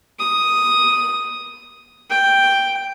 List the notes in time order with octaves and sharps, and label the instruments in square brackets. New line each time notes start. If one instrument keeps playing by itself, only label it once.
[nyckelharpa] D#6
G5